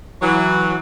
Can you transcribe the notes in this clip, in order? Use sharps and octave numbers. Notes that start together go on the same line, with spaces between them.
E3 F#3